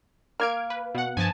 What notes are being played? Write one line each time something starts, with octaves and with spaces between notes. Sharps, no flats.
A#3 F6 G#6 D7
B4
B2 F#5
G2 F3 G#5 A5